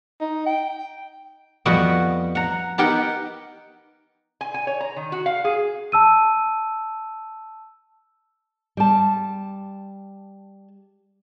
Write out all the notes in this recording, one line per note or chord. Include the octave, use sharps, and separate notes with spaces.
D#4
G5
F2 G3 B3 F#4 D#5 F#5
F#5 A#5
B3 D#4 G4 A#4 F#5 G5
G#5
G#5
C#5
A#5
D#3
F#4
F5
G#4
A5 E6 D#7
G3 A5